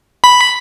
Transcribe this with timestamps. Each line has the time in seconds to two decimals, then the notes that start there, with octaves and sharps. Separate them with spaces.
0.24 B5